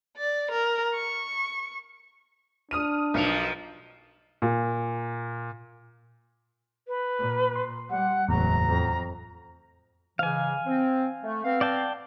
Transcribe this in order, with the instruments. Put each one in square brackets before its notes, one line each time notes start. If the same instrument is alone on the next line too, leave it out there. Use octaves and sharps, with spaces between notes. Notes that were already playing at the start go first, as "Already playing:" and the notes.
[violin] D5
A#4
C#6
[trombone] D4 [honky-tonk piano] D#6 F6 D#7
[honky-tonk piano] B1 C#7 F7 [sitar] B2 F3 A#3
[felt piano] A#2
[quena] B4
[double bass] A#2
[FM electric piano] C6
[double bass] G3 [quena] F#5
[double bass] F#1 F#3 [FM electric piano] E2 A2 [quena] A#5
[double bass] F2
[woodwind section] G#2 C#3 E3 [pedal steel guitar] F5 G#5
[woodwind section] C4
A3
B3 C4 F5
[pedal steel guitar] D5 G5 A5